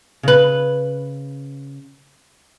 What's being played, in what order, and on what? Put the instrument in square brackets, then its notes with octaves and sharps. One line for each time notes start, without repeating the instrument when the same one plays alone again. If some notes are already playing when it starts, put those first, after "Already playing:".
[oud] C#3 B4